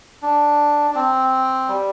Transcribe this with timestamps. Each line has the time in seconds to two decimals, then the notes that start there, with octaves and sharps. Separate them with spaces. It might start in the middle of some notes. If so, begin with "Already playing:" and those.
0.22 D4
0.91 D4
0.95 C4
1.68 G3